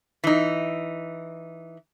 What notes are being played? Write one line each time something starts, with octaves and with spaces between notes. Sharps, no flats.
E3 D#4